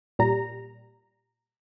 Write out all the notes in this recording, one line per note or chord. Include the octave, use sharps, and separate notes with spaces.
A#2 G3 A#5